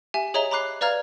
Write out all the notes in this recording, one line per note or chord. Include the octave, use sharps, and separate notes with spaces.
G4 E5 G#5
G#4 C#5 D#5 E5 A#5 G7
A#5 B5 D6 F#6 C7
B4 D5 F5 A#5 F6 G#6